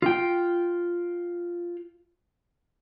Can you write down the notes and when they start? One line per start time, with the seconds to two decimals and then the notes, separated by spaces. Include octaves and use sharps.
0.02 F4 G5